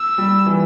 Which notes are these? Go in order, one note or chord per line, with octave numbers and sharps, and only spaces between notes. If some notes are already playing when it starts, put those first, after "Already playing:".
Already playing: E6
G3
E3